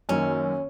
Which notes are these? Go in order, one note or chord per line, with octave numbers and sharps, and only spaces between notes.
F#2 D#3 A#3 C#4